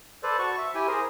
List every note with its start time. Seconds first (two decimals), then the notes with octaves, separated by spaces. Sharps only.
0.23 A4 B4 C5 D5
0.39 F#4 A5 C#6
0.58 E5
0.75 E4 G4 G5 G#5
0.88 G#4 A#4 C5